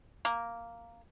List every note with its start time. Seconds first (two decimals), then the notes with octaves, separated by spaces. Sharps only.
0.25 A#3